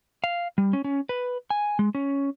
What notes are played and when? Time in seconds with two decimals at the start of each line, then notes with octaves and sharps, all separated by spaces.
0.24 F5
0.58 G3
0.73 C#4
0.84 C#4
1.09 B4
1.50 G#5
1.79 G#3
1.95 C#4